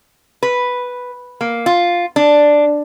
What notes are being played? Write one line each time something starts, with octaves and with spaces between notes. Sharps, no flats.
B4
A#3
F4
D4